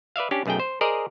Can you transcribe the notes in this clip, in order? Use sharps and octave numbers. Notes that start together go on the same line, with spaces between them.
B4 D5 E5 F5
C#4 D4 G4
B1 F#2 A3 G#4 G5
C5
G#4 A#4 C5 D5 D#5